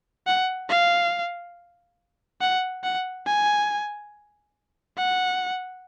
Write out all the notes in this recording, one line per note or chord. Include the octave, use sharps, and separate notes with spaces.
F#5
F5
F#5
F#5
G#5
F#5